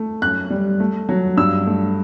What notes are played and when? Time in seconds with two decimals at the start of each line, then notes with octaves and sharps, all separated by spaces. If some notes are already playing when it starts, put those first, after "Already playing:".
Already playing: A3
0.22 F#2 F#6
0.50 G3
0.80 A3
1.09 F#3
1.37 G2 E6
1.66 A3